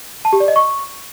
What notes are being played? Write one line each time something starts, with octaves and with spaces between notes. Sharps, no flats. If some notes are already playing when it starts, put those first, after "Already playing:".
A5
G4
D5
D#5
C#6